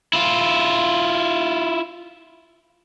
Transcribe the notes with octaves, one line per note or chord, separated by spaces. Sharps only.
E4 F4